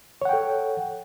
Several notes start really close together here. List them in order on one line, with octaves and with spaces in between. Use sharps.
C#5 F#5 G5 A4